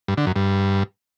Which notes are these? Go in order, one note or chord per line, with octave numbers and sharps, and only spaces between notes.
G2
D3
F#2
G2